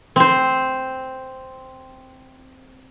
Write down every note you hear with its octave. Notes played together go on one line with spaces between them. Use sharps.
C4 C5